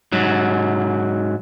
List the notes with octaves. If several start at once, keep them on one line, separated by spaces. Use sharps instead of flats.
G#2 F#3